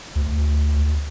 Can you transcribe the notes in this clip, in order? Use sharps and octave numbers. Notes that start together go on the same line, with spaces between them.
D2